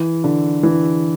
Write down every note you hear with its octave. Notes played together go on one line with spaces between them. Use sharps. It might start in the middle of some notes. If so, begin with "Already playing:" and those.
Already playing: E3
D3
E3